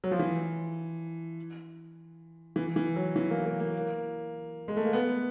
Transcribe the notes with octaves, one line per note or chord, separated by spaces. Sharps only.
F#3
F3
E3
E3
E3
F#3
E3
A#3
A#3
A#3
G#3
A3
A#3
B3